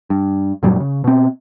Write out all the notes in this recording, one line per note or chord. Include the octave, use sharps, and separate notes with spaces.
G2
F#2 A#2 F#3 G3
C#3
B2 C4